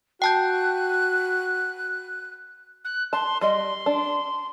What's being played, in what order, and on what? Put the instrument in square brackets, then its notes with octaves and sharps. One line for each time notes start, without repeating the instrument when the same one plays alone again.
[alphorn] F#4 [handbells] G5 A5 G6 [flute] F#6
[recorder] F#6
[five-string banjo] A5 [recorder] C6
[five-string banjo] G3 D#5 [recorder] C6
[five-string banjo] D4